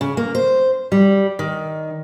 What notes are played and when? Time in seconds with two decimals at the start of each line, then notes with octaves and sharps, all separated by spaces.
0.01 C#3
0.17 A#3
0.35 C5
0.92 G3
1.39 D#3